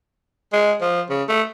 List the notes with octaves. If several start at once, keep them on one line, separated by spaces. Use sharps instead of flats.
G#3
F3
C#3
A3